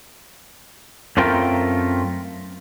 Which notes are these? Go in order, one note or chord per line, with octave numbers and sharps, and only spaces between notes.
F#2 A3 C4 F4 A#4 G5